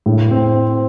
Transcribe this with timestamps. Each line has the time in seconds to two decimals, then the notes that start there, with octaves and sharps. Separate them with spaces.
0.06 A2
0.31 C4